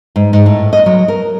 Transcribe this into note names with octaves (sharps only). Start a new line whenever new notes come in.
G#2
G#2
A2
D#5
F#3
A#4